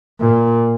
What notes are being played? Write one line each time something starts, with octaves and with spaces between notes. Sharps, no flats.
A#2